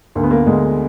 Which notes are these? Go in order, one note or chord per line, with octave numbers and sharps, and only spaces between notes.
D2 D3 A#3 B3
A#3
D2 D3 G#3